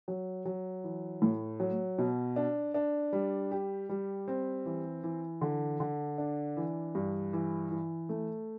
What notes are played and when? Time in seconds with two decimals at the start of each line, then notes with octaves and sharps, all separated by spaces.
0.08 F#3
0.45 F#3
0.84 E3
1.22 A2
1.60 F#3
1.98 B2
2.36 D4
2.74 D4
3.13 G3
3.51 G4
3.89 G3
4.28 C4
4.65 E3
5.03 E3
5.41 D3
5.80 D3
6.18 D4
6.57 E3
6.95 G2
7.33 E3
7.71 E3
8.09 A3